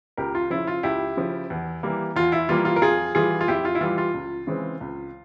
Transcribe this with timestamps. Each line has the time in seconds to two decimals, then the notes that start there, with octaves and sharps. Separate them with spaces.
0.17 C#2 G4 A#4
0.35 F4
0.50 C#3 F3 E4
0.67 F4
0.83 C#2 E4 G4
1.17 C#3 F3
1.50 E2
1.83 E3 G3 A#3
2.16 E2 F4
2.32 E4
2.49 E3 G3 A#3 F4
2.65 F4
2.76 A#4
2.82 F2 F4 G#4
3.15 E3 G3 F4 G#4
3.41 F4
3.48 F2 E4 G4
3.65 F4
3.75 E4
3.81 E3 G3 F4
3.98 F4
4.14 C#2
4.47 C#3 E3 G#3 C4
4.81 C#2